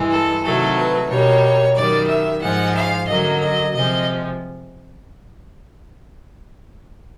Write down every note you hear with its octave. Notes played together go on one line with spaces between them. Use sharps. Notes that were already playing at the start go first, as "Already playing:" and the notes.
Already playing: G2 E3 G#3
A4
C3 D#3 F#3 A3 A4
B4
B2 G3 A#3 C#5
F#2 D#3 G3 D5
E5
G#2 F3 G#3 F#5
F5
F#2 D3 F#3 A#3 D#5
D#5
C3 F3 G#3 D#5